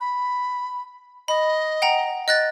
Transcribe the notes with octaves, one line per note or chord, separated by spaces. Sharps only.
B5
D#5 B5
F#5 G5 A#5
D#5 F#6 A6